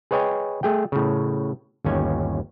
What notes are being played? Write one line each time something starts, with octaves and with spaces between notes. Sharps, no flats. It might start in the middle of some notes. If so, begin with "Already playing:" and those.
G#4 B4 C#5 D#5 G5 G#5
A3 G#4 G5
A2 C#3
G1 D#2 C#4 G#5